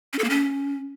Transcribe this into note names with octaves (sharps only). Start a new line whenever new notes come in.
C#4
A4
A#3
C#4